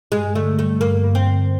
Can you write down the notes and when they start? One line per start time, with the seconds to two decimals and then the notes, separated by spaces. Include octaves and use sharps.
0.12 G2 G#3
0.35 D3 A3
0.58 G3 A3
0.81 G2 A#3
1.04 G2
1.15 C4
1.27 D3